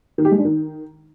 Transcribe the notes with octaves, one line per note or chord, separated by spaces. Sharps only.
D#3
G4
G#3
D4
D#3